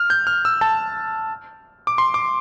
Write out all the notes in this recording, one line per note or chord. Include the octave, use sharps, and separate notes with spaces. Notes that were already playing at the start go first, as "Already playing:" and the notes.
Already playing: F6
G6
F6
E6
A5
D6
C6
D6